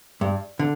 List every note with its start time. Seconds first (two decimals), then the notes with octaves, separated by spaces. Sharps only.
0.21 G2
0.59 D3